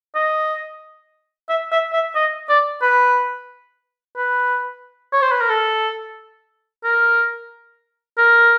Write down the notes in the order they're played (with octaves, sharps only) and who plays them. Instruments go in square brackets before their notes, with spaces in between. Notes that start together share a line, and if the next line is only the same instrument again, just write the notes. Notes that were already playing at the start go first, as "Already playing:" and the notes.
[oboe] D#5
E5
E5
E5
D#5
D5
B4
B4
C#5
C5
B4
A#4
A4
A#4
A#4